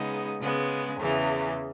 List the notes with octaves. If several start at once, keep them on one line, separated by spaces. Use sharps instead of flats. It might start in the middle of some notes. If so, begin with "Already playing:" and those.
Already playing: C#3 G#3 B3 D#4
C#3 G#3 B3
E2 C#3 E3